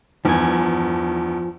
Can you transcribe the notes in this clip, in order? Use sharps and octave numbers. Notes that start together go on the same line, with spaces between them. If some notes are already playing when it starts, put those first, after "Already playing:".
E2 G2 D#3 F3 G#5